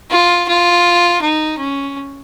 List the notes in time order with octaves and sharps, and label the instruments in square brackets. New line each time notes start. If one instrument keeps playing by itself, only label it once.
[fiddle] F4
F4
D#4
C#4